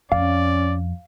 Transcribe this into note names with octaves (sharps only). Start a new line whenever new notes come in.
F2 C#4 D5 F5